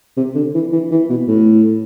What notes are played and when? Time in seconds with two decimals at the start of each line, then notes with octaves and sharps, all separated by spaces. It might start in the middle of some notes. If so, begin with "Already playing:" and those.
0.17 C3
0.35 D3
0.55 E3
0.73 E3
0.91 E3
1.10 B2
1.28 A2